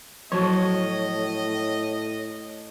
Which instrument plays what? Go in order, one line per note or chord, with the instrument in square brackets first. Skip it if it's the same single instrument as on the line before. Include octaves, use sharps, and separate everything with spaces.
[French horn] A2 [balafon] F3 F#3 F#4 [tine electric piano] C#5 A5 [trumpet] D#5